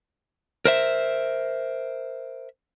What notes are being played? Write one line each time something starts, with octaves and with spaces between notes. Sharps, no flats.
A#4 C5 E5